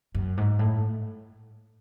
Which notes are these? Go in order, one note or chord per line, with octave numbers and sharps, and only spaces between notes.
F#2
G#2
A2